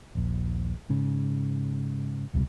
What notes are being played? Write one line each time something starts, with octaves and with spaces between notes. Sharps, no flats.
D#1 A#1
G#2 C#3
E1 C#2 C3 G3